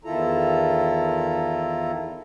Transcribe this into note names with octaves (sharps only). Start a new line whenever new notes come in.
E2 D#3 E4 F4 A4 A#5